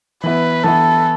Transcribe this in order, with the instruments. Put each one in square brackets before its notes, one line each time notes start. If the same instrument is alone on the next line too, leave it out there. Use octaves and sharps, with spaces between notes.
[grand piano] E3 B3 E4 [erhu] B4
[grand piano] E3 B3 E4 [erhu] A4